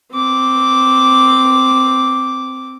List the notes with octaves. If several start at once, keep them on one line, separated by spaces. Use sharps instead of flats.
C4 D6